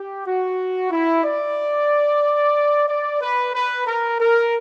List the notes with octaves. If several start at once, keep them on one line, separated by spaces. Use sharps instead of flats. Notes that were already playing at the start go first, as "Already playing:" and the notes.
Already playing: G4
F#4
E4
D5
D5
B4
B4
A#4
A#4